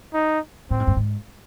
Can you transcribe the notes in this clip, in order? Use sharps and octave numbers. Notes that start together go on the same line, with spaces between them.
D#4
A2 C4
G#2
G2
G#2